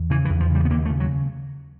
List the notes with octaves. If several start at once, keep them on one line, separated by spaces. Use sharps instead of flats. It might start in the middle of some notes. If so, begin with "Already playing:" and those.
Already playing: E2
C#3 E3
E3
E2
F3
C#3 G3
B3
D#2 A#3
A3
C#3
F#3